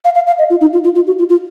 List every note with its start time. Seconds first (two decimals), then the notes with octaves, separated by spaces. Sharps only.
0.05 F5
0.15 F5
0.27 F5
0.38 D#5
0.50 F4
0.61 D#4
0.73 F4
0.84 F4
0.95 F4
1.07 F#4
1.19 F4
1.29 F4